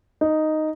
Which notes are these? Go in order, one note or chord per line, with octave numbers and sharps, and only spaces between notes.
D#4